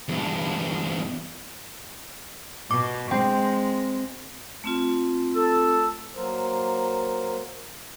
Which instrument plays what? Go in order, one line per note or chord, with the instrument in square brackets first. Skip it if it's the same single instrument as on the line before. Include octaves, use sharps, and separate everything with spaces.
[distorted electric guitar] E2 G2
[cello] B2 [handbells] D6
[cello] G#3 [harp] C4 [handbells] G5
[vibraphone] A3 C4 F4
[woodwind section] A4
[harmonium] F#3 A#3 A#4 C5